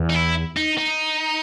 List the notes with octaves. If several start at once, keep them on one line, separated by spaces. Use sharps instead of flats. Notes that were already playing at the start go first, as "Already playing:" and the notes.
Already playing: E2
D#4
E4
D#4
D#4